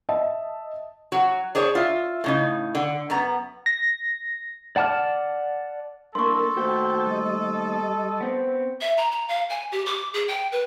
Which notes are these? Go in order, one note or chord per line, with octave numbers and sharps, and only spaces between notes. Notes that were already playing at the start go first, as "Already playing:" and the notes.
D#5 E5 A5
F#3 F#4
D4 G#4 C5 C#5
F4 E5
A2 C#3 D#4
D3
F#2 B3 A#5
A#6
D5 F#5 A5 D6 F6
G2 A#3 A4 A#4 C6 C#6
D#2 A3 F#4 C5 G5
G3 D#5
B3 C4
E5
A#5
A#5
F5
G#5
G4
D6
G#4
G5
B4